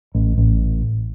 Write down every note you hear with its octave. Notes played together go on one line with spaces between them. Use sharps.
A1
A1